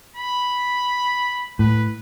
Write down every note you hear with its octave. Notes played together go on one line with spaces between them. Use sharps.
B5
A2 B4